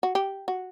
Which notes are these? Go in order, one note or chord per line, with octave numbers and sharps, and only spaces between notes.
F#4
G4
F#4